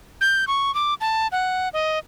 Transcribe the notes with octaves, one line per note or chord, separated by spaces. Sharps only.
G6
C#6
D6
A5
F#5
D#5